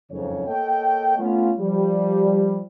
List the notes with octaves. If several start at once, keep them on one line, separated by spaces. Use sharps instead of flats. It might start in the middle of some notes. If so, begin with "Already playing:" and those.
F#1 F2 G#2 C#3 C#5
A#3 A4 C#5 D#5 G5
A3 B3 C#4 F4
F3 G3